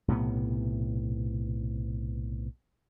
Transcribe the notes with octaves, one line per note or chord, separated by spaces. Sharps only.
B1 A2 C3 B3